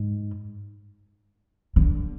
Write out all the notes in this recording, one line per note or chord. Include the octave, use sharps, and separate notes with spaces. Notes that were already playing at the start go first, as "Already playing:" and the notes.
Already playing: G#2
D3